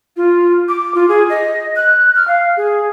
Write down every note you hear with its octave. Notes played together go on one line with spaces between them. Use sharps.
F4
D6
F4
G#4
D#5
F#6
F6
F5
G#4